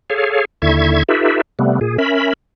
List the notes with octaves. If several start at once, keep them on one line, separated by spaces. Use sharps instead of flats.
G#4 A4 C#5 F5
D#2 D3 E4 E5 C#6 G#6
D#4 F4 G4 A4 B4 E5
C3 G3 A3 B3
A#2 G#4
C#4 A#4 E5 B5